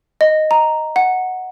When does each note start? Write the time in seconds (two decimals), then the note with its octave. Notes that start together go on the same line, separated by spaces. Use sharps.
0.21 D#5
0.51 A#5
0.96 F#5